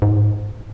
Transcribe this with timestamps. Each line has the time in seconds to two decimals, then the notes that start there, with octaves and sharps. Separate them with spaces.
0.02 G#2